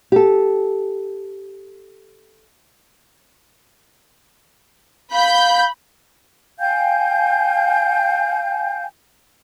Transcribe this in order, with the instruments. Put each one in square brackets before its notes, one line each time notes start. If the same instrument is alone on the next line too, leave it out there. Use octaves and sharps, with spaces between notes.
[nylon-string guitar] G4 A4
[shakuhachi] F5 [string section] B5 G6
[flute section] F5 G5 G#5 G6